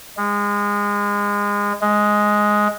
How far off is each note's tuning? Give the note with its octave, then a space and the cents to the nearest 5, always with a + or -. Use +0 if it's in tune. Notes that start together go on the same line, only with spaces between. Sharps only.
G#3 -25
G#3 +5